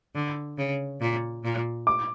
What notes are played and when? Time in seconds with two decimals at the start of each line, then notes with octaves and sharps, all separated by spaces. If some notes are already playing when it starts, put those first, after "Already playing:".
0.15 D3
0.58 C#3
1.01 A#2
1.44 A#2
1.87 D6